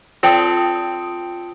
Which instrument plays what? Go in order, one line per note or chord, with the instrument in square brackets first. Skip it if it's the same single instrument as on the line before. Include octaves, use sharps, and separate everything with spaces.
[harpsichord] C4 A4 [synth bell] F4 G5 D#6